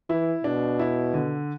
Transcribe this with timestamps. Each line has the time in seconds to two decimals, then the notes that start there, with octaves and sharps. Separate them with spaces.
0.10 E3 E4
0.44 B2 D4
0.79 E4
1.14 D3